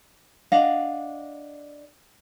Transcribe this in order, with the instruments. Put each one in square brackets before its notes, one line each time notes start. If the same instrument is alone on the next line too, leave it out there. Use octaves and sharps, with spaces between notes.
[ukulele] D4 D#5 F5 F#5